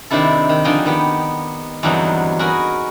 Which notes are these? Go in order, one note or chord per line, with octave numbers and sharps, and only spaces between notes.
C3 D#3 D4 E4 A4
D#3
D3 F3 D#4 G#4 D#5 G5
D#3 B3 G4
E2 G2 D3 F#3 C4 D#4
F#4 G#4 A#4 B4 D#5